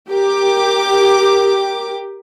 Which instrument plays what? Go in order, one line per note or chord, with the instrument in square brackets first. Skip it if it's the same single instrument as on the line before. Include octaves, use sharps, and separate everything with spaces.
[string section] G4 A#4 G5 D6